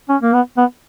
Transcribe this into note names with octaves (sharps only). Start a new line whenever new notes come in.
C#4
A#3
B3
B3